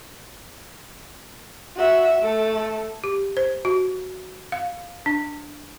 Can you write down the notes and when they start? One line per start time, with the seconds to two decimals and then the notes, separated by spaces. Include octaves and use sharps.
1.76 F#4 E5
2.23 A3 A4
3.04 G4
3.37 C5
3.65 F#4
4.52 F5
5.06 D4